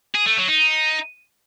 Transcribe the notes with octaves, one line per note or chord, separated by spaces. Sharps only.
G#4
A3
F#3
D#4